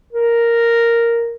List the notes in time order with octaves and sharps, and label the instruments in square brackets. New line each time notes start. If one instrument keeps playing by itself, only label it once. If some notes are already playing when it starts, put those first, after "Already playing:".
[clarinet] A#4